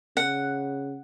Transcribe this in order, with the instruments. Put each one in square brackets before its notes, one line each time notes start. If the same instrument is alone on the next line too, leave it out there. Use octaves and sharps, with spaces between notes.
[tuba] C#3 [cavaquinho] F#5